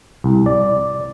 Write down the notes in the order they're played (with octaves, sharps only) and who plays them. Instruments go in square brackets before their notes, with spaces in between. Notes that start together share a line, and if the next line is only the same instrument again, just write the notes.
[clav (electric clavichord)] C2
D5